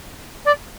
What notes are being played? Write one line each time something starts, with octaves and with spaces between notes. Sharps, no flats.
D5